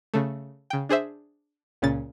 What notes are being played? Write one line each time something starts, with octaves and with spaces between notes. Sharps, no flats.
C#3 A3
C#3 G5
D4 G#4 C5 E5
C#2 A#2 C#3 C#4 A6